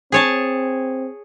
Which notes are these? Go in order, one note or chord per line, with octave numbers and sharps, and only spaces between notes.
C4 G#4 C#5 A5